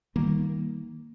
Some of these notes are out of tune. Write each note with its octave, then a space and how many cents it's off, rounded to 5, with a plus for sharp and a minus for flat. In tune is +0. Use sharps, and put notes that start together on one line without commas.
D#3 +20 G3 +0 A#3 +0